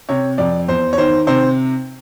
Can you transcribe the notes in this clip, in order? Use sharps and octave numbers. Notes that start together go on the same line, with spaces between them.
C3 C#5
F2 D5
E2 C5
C#5
D#3 C5
C3 C5